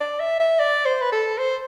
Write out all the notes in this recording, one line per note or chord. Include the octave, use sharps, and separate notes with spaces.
D5
E5
E5
D5
C5
B4
A4
C5